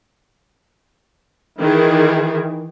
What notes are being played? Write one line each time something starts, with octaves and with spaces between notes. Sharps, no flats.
D#3 E3 G#4